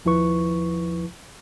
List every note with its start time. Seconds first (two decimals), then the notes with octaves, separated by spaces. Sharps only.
0.05 D#2 F3 E4 B4 C#6